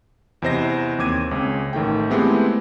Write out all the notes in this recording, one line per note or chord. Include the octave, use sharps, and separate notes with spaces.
E2 C3 E4 C5 D#5 A#6
D#2 C4 D6 G#6 D#7
C#2 C4 C#4
A1 D#3 A3 G5
G#3 A3 B3 C4 E4 G4